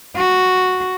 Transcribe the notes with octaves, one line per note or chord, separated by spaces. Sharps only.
F#4